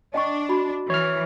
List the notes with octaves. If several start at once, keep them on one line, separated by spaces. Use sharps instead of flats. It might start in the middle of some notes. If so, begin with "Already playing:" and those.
D4 D#5 G5 C#6
F#4 B5
E3 C#5 F6